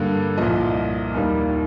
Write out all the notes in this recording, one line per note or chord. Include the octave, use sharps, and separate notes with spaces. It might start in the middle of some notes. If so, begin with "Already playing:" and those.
Already playing: G2 D3 G3 A#3
C2 A#2 F3 D#5
D#2 D#3 G3 A#3